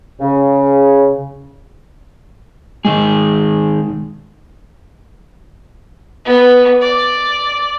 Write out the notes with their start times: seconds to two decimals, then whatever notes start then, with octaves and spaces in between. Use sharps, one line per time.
0.20 C#3
2.85 D#3 G#3 G#4
6.25 B3
6.82 D5